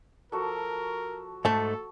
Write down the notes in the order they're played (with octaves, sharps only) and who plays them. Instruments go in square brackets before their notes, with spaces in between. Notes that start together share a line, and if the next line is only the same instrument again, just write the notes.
[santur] F3 F#4 A4 [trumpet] A#4
[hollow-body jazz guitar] G#2 A3 [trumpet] A4 [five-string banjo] A5